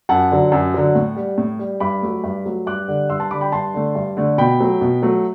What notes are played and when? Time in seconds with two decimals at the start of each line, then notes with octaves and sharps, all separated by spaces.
0.09 F#2 F#5 A5
0.31 D3 F#3
0.52 F#2
0.74 D3 F#3
0.95 A2
1.16 G3
1.38 A2
1.59 G3
1.80 G2 B5 D6
2.02 F#3 A3
2.24 G2
2.46 F#3 A3
2.67 G2 D6 F#6
2.88 D3 G3
3.09 G2 C6 E6
3.20 A5 C6
3.31 D3 G3 B5 D6
3.41 G5 B5
3.52 G2 A5 C6
3.74 D3 A3
3.95 G2
4.17 D3 A3
4.38 B2 G5 B5
4.60 F#3 A3
4.81 B2
5.02 F#3 A3